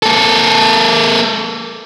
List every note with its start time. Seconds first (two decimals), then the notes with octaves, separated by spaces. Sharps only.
0.03 A#3 A4